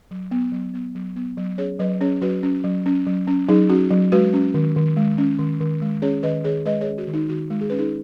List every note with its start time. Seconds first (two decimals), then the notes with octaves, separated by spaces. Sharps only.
0.11 F#3
0.31 B3
0.52 F#3
0.74 B3
0.95 F#3
1.16 B3
1.37 F#3
1.58 C#4 G#4 C#5
1.79 F#3 B4 D#5
2.00 C#4 G#4 C#5
2.22 F#3 F#4 B4
2.43 C#4
2.64 F#3
2.86 C#4
3.06 F#3
3.27 C#4
3.48 F#3 D#4 G#4
3.70 C#4 F#4
3.90 F#3
4.12 G#3 F#4 B4
4.33 C#4
4.54 D#3
4.76 D#3
4.96 G#3
5.18 C#4
5.39 D#3
5.60 D#3
5.82 G#3
6.02 C#4 G#4 C#5
6.23 D#3 B4 D#5
6.44 D#3 G#4 C#5
6.66 G#3 B4 D#5
6.81 G#4 C#5
6.87 C#4
6.98 F#4
7.08 D#3
7.13 D#4
7.29 D#3 F#4
7.50 G#3
7.61 G#4
7.70 C#4 B4
7.78 D#4 G#4